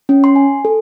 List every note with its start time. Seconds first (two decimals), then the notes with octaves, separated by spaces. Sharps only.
0.09 C#4
0.24 C6
0.36 G#5
0.65 A4